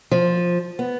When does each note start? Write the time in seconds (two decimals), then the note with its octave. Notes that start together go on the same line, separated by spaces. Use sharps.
0.11 F3
0.79 B3